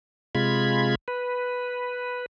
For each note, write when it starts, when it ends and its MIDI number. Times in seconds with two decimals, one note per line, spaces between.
0.35 0.95 48
0.35 0.95 56
0.35 0.95 65
0.35 0.95 83
0.35 0.95 92
1.08 2.26 71